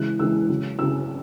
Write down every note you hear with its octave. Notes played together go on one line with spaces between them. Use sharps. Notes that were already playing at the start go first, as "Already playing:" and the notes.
Already playing: C#3 E3 G#3 F#6
C#3 E3 G#3 E6
C#3 F#3
C#3 F#3 E6